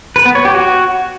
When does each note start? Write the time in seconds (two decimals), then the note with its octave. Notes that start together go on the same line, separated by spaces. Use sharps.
0.16 B4
0.26 B3
0.35 C#5
0.45 G4
0.55 F#4